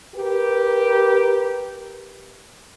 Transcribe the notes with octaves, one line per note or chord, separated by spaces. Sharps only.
G4 A#4 B4